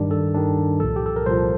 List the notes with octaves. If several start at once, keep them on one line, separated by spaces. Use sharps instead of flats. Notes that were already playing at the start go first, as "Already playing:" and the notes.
Already playing: G2 D#3 G3 D4
A4
G2 D#3 G3 D4
C2 A#2 F3 A4
G4
A4
A#4
C2 A#2 F3 C5